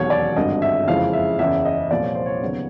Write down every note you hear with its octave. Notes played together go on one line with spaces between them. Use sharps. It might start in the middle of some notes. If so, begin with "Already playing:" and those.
Already playing: E1 D#2 D#3 F#3 C#5
D5
G#1 G2 D3 D#5
E5
F#1 F2 C#3 E3 G#3 F5
E5
F#1 E2 C#3 E5
D#5
C2 A#2 F3 D5
C#5
C5
C#5
D#2 C#3 F#3 B3